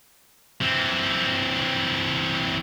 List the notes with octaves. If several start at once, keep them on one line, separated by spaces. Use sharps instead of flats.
E3 C4